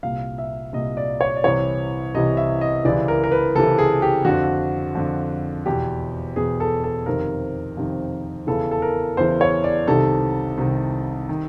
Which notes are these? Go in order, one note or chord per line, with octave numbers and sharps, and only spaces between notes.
C2 A#2 F5
E5
C2 A#2 D#5
D5
C#5
D5
C2 C3 E3 C#5
C2 C3 E3 D#5
E5
D#5
C#2 C3 E3 D5
A#4
A#4
B4
C#2 C3 E3 A4
G#4
G4
F2 D3 F#4
F2 D3
E2 B2 G4
E2 B2 G#4
A4
A4
F2 C3 D#3 A#4
F2 C3 D#3
E2 C#3 E3 A4
A4
A#4
E2 C#3 E3 C5
C#5
D5
C2 C3 D#3 A4
C2 C3 D#3
D#3